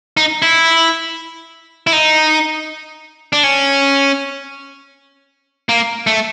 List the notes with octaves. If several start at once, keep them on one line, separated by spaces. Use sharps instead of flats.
D#4
E4
E4
D#4
D4
C#4
A#3
A3